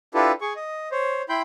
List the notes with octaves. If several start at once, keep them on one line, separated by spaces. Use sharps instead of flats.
D4 E4 F4 G4 A4 B4
G#4 C#6
D#5
C5 C#5
E4 G5 B5 C6 G6